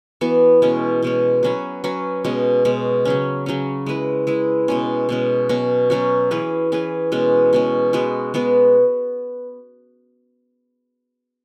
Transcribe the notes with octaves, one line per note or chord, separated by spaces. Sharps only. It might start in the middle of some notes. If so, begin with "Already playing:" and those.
E3 B3 F#4
B2 G#3 C#4
B2 G#3 C#4
F#3 C#4 F#4 B4
F#3 C#4 F#4 B4
B2 G#3 C#4
B2 G#3 C#4
C#3 F#3 C#4
C#3 F#3 C#4
G#3 E4 B4
G#3 E4 B4
B2 G#3 C#4
B2 G#3 C#4
B2 F#3 C#4 F#4
B2 F#3 C#4 F#4
E3 C#4 G#4 B4
E3 C#4 G#4 B4
B2 G#3 C#4
B2 G#3 C#4
G#3 B3 F#4 B4
G#3 B3 F#4 B4